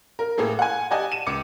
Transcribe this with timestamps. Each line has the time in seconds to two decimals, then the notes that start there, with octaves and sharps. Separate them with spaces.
0.19 A#4
0.38 A2 A#3 G#4 A4
0.59 F#5 G#5
0.91 G4 D5 D#5 F#5 G#5 A5
1.12 D#7 E7
1.26 C#2 D6 C#7